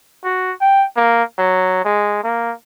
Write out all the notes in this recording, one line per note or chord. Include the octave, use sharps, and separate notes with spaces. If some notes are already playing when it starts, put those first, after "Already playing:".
F#4
G5
A#3
F#3
G#3
A#3